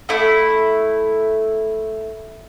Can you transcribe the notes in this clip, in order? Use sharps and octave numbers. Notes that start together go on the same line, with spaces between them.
A3 E4